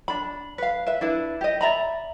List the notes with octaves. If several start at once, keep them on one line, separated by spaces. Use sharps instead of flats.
D4 B5
B4 F5
B4 E5
D4 E4 B4
G4 D#5
D5 E5 A#5 B5